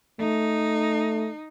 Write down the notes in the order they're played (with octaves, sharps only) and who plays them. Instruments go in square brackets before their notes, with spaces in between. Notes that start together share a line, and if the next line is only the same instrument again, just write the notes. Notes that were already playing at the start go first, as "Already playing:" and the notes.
[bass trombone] A3 [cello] D#4